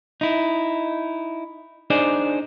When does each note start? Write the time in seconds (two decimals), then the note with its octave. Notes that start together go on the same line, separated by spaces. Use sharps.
0.21 D#4 E4
1.90 D4 D#4 G#4 C5 D5